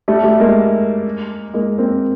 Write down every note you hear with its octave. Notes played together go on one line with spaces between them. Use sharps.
G3 A3
G3 A3
G#3 A#3
G#3 A#3
A#3 C4